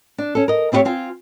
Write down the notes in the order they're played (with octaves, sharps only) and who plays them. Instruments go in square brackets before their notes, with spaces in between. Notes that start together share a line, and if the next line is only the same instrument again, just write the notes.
[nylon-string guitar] D4
C#4 A4
A#4 D#5
A3 C4 E4 G4 C#5 F5
C4 F4 G#5